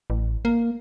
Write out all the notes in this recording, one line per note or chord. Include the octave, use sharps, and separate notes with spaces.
A1
A#3